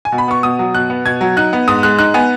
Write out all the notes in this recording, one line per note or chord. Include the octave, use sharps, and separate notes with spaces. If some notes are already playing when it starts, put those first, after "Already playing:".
G#5
B2
B5
B3 C#6
B2 D#6
F#3
B2 F#6
B3
B2 G#6
F#3
D#4 F#6
B3
G#2 D#6
G#3 F#6
D#4 F#6
B3 G#5